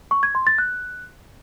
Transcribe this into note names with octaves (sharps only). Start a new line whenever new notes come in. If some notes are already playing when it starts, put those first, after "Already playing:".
C#6
G#6
C6
A6
F#6